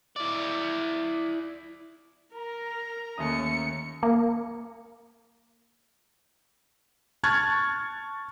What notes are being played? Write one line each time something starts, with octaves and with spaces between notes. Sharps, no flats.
E4 D5
A#4 A#5
D#2 A3 C#4 D#6 C#7
A#3
A5 C#6 F6 F#6 G#6 A6